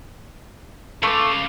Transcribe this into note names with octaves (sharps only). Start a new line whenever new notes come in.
C#3 A3 F4 D6